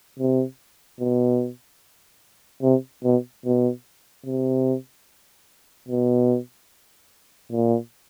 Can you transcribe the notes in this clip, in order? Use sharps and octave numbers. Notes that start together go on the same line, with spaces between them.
C3
B2
C3
B2
B2
C3
B2
A#2